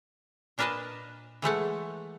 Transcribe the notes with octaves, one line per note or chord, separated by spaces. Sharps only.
A#2 D4 A#4 B4 D#5 A5
E3 G#3 A3 F#5